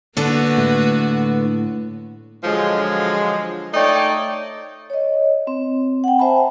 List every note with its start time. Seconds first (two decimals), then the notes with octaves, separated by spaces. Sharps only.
0.17 D3 A#3 B3 F#4 B4
0.58 A2
2.44 D3 F3 F#3 G#3
3.73 A3 D#4 C#5 D5 G5
4.90 C#5 D#5
5.47 C4
6.04 F#5 G5
6.19 C5 E5 G#5 A5 B5